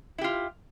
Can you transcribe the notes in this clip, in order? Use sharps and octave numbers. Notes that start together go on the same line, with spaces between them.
E4 F4 G4